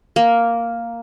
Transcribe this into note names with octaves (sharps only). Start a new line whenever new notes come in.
A#3